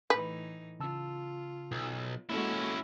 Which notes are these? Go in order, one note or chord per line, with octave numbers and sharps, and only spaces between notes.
A2 E3 D#4 B4
C#3 F4 A5 E6
B1
G#3 A#3 C#4 E4 F#4 A4